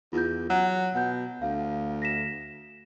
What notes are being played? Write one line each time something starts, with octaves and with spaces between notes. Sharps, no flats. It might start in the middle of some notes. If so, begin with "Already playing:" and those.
E2 F4 G6
F#3 F#5 F#6
B2 F#5 G6
D2 F5
A#6 B6 E7